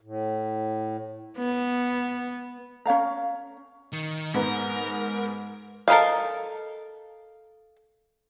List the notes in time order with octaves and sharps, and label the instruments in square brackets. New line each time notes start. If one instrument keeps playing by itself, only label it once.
[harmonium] A2
[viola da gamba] B3
[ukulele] C#4 C#5 F5 A#5
[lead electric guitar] D#3
[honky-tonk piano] G#2 B3 [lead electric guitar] A#4
[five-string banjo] A4 A#4 C5 D#5 F5